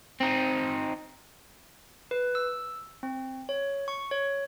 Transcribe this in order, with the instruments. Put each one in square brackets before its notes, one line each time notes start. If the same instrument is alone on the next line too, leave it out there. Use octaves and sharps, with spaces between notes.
[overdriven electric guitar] C4 D#4
[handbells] B4
E6
C4
C#5
C#6
C#5